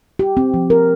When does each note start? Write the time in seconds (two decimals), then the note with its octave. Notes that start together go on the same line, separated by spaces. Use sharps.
0.19 G4
0.37 C4
0.54 F3
0.70 A#4